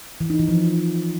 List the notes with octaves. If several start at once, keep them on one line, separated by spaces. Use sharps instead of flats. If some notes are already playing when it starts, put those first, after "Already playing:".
E3
D#4
E3
F3